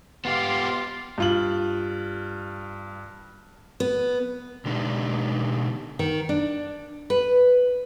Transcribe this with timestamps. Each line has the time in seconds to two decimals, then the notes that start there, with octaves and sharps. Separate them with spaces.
0.25 B3 F4 G4 F5 C6 D6
1.18 G2 F4 F#7
3.80 B3
4.65 B2 D3 G#3 D4 D#4 G4
5.99 D#3
6.29 D4
7.10 B4